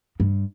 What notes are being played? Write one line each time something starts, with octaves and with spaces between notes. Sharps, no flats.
G2